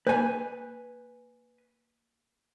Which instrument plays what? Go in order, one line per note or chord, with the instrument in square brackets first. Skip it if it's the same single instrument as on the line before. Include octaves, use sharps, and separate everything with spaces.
[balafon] A#3 [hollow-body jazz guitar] B4 G#5